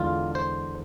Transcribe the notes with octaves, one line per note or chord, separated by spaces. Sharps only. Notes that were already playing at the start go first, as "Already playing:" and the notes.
Already playing: E2 D3 G#3 F4
C5